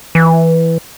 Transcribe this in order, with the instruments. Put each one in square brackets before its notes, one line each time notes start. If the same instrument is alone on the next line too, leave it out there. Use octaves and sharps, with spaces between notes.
[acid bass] E3